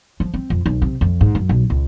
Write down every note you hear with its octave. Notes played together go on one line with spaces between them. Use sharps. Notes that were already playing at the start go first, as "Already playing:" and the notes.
F3
C4
F2
B1
C3
F2
G#2
F#2
B1
C#2